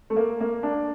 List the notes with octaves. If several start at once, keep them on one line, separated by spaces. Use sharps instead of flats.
A3
A#3
A#3
D4